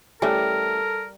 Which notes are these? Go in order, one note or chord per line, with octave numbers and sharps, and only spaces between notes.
E3 G3 A3 C#4 A4 A#4